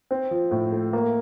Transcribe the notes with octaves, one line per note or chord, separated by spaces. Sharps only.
C4
F3
A2
A3
A#3